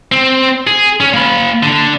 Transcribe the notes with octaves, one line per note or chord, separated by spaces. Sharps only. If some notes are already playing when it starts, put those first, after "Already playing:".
C4
G#4
C#4
A#3 B5
D3 D4